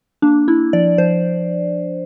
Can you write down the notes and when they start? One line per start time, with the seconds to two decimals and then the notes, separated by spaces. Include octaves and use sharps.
0.22 A#3 D4
0.48 D4 E4
0.73 F3 D5
0.98 F3 C5